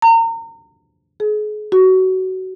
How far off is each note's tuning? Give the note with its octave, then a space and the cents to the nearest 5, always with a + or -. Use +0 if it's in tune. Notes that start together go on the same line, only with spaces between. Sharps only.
A#5 -30
G#4 +35
F#4 +20